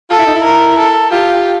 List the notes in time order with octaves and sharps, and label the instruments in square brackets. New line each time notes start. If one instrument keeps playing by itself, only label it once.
[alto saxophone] F4 [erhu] A4
[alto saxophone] E4
D#4
E4
[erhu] A#4
A4
[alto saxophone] F4 [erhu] G4